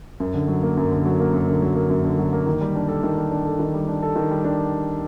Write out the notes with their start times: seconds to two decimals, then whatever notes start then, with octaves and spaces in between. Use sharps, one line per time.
0.20 F#2
0.34 D3
0.48 F#3
0.63 A#3
0.77 F#2
0.92 D3
1.05 F#3
1.20 A#3
1.34 F#2
1.48 D3
1.62 F#3
1.75 A#3
1.90 F#2
2.04 D3
2.19 F#3
2.33 A#3
2.47 D#3
2.61 G3
2.75 D4
2.88 A4
3.03 D#3
3.17 G3
3.31 D4
3.45 A4
3.59 D#3
3.74 G3
3.88 D4
4.03 A4
4.16 D#3
4.31 G3
4.44 D4